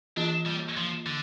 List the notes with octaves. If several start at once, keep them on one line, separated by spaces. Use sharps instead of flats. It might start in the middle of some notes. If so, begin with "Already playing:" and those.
E3 A#3 D4 F4
G3
F3
D3